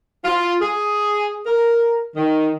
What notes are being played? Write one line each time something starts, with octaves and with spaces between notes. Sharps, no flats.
F4
G#4
A#4
D#3